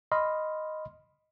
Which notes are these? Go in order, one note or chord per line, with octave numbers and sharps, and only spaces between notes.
D#5 B5 C6 F6